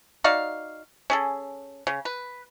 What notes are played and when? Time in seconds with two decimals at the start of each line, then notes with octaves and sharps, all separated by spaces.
0.24 D#4 F#4 D5 F5
1.10 C#4 G#4 A4
1.87 C#3
2.05 B4